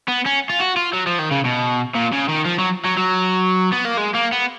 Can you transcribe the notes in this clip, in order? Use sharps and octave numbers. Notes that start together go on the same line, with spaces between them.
B3
C#4
F4
F#4
F4
F#3
F3
D#3
C#3
B2
A#2
C#3
D#3
F3
F#3
F#3
F#3
B3
A#3
G#3
A#3
B3